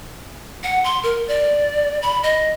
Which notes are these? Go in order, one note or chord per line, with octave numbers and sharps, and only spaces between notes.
F#5
C6
A#4
D5
B5
D#5